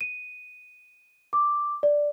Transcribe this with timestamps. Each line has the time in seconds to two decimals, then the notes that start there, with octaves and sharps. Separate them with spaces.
0.01 D#7
1.33 D6
1.83 D5